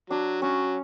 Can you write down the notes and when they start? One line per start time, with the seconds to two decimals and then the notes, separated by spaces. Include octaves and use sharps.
0.10 F#3 D4
0.42 F#3 C#4